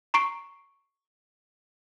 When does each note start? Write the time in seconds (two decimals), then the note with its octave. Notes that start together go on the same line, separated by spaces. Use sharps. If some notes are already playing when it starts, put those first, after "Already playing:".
0.14 A#5 C#6 C7 D7